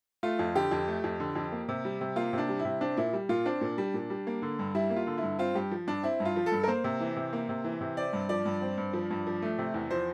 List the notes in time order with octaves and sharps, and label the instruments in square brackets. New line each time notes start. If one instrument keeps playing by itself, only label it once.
[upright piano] A3 F4
F2
D3 G4
F2
A3
F2
D3
F2
A#3
C3
G3
C3
A#3 F4
C3
D4
G3
E4
C3
C4 D4
A#2 E4
G3
A#2 F4
C4 D4
A#2
G3
A#2
G3
A#3
D3
G2
G3 E4
A#3
F4
D3
E4
G2
C4 F4
G2 G4
F3
G2 D4
C4 E4
G2
F4
F3
A4
G2
A#4
A#3 C5
C3
E3
C3
A#3
C3
E3
C3
C4 D5
G2
F3 D5
G2
C4
G2
F3
G2
F3
A3
C3
E2
F3 C5